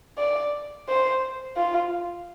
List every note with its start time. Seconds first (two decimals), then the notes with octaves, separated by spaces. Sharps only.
0.18 D5
0.89 C5
1.57 F4